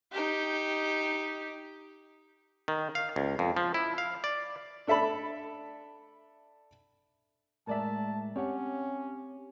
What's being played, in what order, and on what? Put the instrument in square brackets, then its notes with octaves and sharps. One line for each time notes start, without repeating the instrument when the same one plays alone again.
[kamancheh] D#4 G4
[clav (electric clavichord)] D#3
F5
C#2
F2
F3
E4
F5
D5
[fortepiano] D4 A4 E5 A5 B5
[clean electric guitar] A2 G#3 [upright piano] A#4 D5 E5 [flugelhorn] A5
[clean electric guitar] C4 G4 F#5 [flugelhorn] C#4 [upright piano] C#5